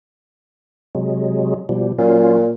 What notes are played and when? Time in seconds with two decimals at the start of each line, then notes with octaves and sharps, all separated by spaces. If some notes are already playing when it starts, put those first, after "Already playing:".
0.95 C3 F#3 G#3
1.69 B2 F3 G3
1.99 A#2 F#3 C#4 F4